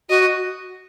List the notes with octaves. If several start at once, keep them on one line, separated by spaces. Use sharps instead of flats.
F#4 D#5